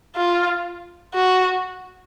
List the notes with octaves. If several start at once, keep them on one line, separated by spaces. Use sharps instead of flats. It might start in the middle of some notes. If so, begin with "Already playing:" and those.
F4
F#4